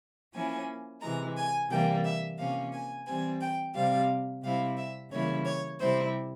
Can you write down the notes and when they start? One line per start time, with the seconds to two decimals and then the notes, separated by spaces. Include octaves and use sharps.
0.34 F3 A#3 C#4 E4 G#5
1.01 C3 E3 G#3 A#5
1.37 G#5
1.70 C3 E3 G3 A#3 G5
2.05 E5
2.38 C3 F3 A#3 C#4 F5
2.73 G#5
3.06 E3 G3 C4 G#5
3.41 G5
3.75 C3 G3 C4 F5
4.43 C3 G3 C4 E4 F5
4.77 E5
5.11 C#3 E3 G3 A#3 E4 C#5
5.45 C#5
5.80 C3 G3 C4 E4 C5